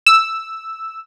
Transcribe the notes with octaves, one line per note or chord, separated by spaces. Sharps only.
E6